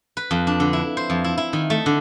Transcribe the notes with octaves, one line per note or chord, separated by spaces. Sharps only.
B4
F2
D4
D3
E4
C5
F2
E4
E4
D#3
A3
D3